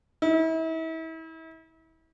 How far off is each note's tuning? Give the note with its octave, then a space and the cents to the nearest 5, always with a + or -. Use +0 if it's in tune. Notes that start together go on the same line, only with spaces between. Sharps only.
E4 -35